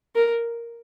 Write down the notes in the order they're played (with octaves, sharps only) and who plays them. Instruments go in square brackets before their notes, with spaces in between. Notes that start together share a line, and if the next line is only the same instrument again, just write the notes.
[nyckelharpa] A#4